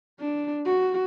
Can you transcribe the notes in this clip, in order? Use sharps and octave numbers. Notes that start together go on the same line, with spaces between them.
D4
F#4